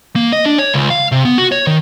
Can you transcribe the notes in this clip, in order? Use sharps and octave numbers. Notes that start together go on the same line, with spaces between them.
A#3
D#5
D4
C#5
C#2
F5
C3
B3
F#4
C#5
D#3